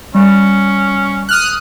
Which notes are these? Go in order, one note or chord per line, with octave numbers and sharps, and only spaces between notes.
G3 C#4
D#6 F6 F#6